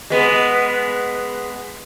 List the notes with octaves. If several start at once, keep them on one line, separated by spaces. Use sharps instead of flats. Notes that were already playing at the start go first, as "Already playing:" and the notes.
G#3 B3